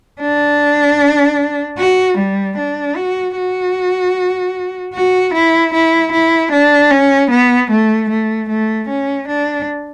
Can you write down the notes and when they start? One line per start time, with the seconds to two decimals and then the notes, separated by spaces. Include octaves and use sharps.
0.21 D4
1.78 F#4
2.18 G3
2.57 D4
2.96 F#4
3.36 F#4
4.94 F#4
5.33 E4
5.73 E4
6.12 E4
6.52 D4
6.91 C#4
7.31 B3
7.71 A3
8.10 A3
8.49 A3
8.88 C#4
9.28 D4